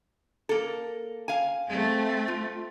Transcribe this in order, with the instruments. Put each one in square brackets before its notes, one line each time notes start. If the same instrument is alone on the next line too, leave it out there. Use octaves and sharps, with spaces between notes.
[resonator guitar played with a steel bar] A#3 A4
F5 G#5
[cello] A3 C4
[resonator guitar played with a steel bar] F4